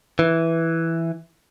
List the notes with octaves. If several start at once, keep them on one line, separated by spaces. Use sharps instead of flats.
E3